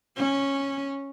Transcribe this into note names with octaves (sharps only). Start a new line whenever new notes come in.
C#4